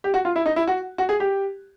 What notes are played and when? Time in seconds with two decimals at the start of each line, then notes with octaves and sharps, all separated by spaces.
0.04 G4
0.14 F#4
0.25 F4
0.36 E4
0.46 D#4
0.56 E4
0.68 F#4
0.98 F#4
1.09 G#4
1.20 G4